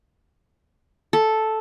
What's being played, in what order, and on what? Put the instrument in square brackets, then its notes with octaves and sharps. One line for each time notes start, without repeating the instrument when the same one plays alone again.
[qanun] A4